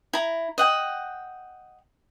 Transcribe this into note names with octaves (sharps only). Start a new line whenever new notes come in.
E4 A#5
D#5 F#5 G5